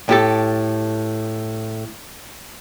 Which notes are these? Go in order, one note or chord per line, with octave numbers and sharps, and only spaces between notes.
A2 G4 A4